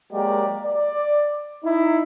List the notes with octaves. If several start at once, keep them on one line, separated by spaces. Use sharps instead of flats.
F#3 G#3 A#3 G4 A#4 D5
D5
D#4 E4